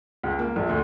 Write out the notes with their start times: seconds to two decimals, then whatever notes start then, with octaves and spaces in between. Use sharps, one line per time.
0.23 C#2
0.39 A#3
0.56 A#1
0.69 D2